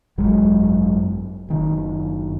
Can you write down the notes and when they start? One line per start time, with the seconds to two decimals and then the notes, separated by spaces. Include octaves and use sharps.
0.18 G#1 F#2 F#3 G#3
1.48 F#1 D#3